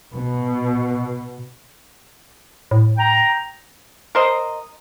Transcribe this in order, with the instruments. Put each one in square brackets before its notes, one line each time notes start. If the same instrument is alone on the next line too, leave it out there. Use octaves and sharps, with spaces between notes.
[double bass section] B2
[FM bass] A2
[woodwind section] G5 A#5
[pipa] A#4 C5 D#5